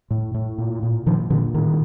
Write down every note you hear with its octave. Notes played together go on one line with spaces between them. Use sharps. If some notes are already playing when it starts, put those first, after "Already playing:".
A2
A2
A#2
A#2
A#2 D#3 F3
A#2 D3 E3
A2 D#3